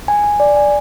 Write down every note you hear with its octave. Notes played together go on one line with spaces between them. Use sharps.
G#5
G#5
D5
G#5